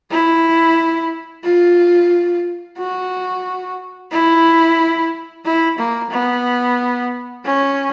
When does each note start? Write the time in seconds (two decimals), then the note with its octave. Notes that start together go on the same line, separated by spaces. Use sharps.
0.11 E4
1.44 F4
2.78 F#4
4.12 E4
5.45 E4
5.79 A#3
6.11 B3
7.45 C#4